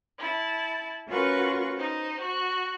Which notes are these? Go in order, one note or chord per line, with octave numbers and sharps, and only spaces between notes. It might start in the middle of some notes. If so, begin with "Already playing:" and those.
E4 A5
C#4 F4 F#4 A#4 B4 C#6
D#4 C5
F#4